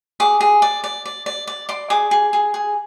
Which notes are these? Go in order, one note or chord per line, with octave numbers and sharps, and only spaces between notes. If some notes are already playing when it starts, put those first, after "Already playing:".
G#4 D6
G#4
D5
D5
D5
D5
D5
D5 C6
G#4 D6
G#4
G#4
G#4